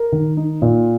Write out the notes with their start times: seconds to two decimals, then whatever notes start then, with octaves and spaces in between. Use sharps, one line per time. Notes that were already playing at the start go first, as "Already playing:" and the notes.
Already playing: A#4
0.12 D#3
0.37 D#4
0.62 A#2